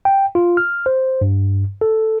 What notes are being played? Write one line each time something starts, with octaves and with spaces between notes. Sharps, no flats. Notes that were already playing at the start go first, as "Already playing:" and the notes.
G5
F4
F6
C5
G2
A4